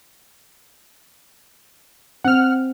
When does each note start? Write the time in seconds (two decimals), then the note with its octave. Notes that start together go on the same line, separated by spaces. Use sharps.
2.24 C4 F#5 F6